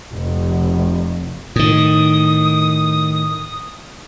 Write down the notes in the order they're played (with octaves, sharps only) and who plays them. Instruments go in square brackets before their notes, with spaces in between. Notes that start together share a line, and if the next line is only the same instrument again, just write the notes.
[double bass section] F1
[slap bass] A2 D#3 [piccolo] D#6